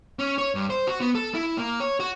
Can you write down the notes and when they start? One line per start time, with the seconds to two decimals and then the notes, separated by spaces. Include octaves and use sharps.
0.19 C#4
0.38 C#5
0.55 G2
0.70 C5
0.87 F#4
1.01 B3
1.15 A4
1.35 E4
1.57 A#3
1.80 C#5
2.00 F#4